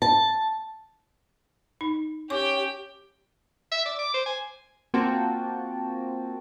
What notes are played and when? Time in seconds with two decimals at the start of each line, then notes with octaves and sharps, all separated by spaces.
0.02 A5
1.81 D#4
2.30 C#4 G4 G5 C#6 D6
3.71 E5
3.85 D5
3.99 D6
4.14 C5
4.26 G#5
4.94 A#3 C4 F4 F#4 G5 A5